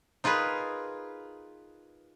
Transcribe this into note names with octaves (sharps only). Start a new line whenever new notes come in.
D#4 F4 G#4 A#4 B4